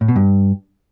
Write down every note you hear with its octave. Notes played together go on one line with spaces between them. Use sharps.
A2
B2
G2